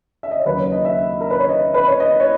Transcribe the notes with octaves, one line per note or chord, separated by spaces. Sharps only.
E5
D#5
C#5
D#2 C#3 F#3 A#3 B4
C#5
D#5
E5
A#4
B4
C#5
D#5
B4
C#5
D#5
C#5